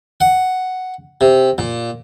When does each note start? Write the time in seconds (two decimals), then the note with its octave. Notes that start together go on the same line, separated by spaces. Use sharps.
0.21 F#5
1.21 C3
1.58 A#2